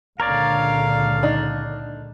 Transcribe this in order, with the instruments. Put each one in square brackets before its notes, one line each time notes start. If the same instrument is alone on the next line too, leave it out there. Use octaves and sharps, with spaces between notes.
[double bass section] C#2 A#2 D3 [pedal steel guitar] A#4 C#5 D5 [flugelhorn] F5
[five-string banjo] D4 D#4